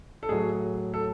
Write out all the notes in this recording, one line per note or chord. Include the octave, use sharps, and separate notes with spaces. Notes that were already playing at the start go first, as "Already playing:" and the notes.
A4
A2 F#3 G#4
A4